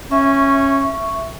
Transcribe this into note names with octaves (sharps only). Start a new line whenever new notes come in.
C#4 E5 C#6